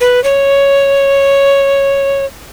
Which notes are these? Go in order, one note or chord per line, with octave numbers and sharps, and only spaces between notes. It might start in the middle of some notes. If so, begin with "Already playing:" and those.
B4
C#5